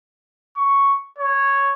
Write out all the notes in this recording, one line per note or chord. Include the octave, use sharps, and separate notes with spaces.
C#6
C#5